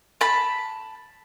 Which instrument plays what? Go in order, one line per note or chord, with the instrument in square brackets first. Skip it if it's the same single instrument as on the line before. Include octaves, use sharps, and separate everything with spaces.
[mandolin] A5 B5